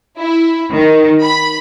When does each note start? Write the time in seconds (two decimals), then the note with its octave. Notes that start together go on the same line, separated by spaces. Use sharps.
0.18 E4
0.72 D#3
1.23 B5